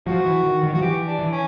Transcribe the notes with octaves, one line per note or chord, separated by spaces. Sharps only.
F3 F#4
F3
E3
D#3
D#3
F3 F#4
E3 G4
D4
E3
C#4